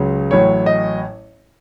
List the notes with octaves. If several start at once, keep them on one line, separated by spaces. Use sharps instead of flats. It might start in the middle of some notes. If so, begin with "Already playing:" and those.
Already playing: C#2 C#3 F#3
A1 A2 F#3 C#5
D#5